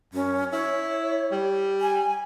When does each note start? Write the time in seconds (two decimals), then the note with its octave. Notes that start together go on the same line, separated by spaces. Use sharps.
0.14 F#2 C#4
0.53 E4 C#5
1.32 G3
1.81 G#5